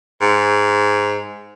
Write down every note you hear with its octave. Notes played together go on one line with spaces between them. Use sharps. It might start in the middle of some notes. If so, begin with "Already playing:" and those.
G#2